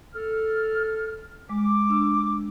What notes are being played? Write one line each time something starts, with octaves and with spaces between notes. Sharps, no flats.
A4 F6
G#3 D6
D4 E6